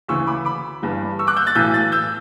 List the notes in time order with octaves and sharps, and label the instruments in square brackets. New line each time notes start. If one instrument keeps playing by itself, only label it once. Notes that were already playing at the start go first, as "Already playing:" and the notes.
[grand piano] D2 C#3 E3 C#6 E6
B5 D6
B5 D6
G1 G2 E3
C#6 E6
D6 F#6
E6 G6
F#6 A6
B1 A2 E3 E6 G6
F#6 A6
E6 G6